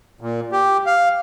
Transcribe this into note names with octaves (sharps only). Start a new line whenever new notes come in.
A#2
G4
F5